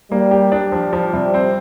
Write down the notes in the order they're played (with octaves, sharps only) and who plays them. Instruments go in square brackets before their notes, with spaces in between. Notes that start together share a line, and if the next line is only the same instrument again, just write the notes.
[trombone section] G3 [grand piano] A#3
[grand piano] G4
[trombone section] G3 [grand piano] D4
[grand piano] F3
F3
C3
C4